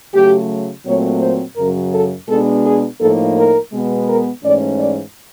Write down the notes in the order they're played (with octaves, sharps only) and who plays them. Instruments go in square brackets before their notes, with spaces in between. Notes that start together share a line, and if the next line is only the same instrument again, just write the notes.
[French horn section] C#3 F#3 A3 G4
A#2 F#3 A3 C4 C#5
C5
F#2 C#3 F#3 A#4
A4
B2 G#3 B3 D4 A4
G#4
A2 F3 A#3 D#4 A4
A#4
B2 G#3 B3
A#4
G#2 E3 A3 C#4 D5
D5